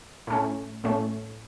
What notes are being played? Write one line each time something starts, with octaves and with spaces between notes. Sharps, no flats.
A2 A3 C#4
A2 A3 C#4